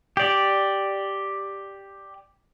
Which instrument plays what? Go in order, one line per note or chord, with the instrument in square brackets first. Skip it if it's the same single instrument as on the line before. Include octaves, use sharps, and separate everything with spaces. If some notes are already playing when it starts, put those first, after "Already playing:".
[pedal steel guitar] G4 D5